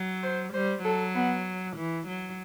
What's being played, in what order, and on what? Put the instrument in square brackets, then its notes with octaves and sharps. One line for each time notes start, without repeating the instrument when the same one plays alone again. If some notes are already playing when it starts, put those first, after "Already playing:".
Already playing: [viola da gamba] F#3
[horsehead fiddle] C5
[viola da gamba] G3 [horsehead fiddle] C5
[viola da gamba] F#3 [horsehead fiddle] A4
[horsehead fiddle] B3
[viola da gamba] E3
F#3